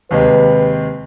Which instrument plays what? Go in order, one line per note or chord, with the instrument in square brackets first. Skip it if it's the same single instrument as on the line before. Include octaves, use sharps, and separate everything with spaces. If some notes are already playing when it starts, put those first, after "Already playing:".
[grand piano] D#2 C3 G#3 [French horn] B4